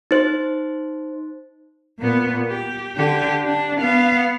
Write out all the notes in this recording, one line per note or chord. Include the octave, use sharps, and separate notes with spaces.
D#4 C5
A#2 B3
G4
D3 G4
D4
B3 F5